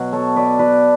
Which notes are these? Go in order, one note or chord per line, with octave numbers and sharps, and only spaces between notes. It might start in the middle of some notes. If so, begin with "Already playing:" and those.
Already playing: B2 F#3
A4 C#5
B4 D5
B4 D5